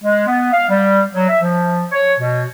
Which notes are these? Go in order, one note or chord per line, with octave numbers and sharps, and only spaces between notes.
G#3
B3
F5
G3
F#3
E5
F3
C#5
B2